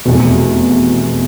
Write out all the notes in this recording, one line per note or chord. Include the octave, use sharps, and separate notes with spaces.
F1 E2 B2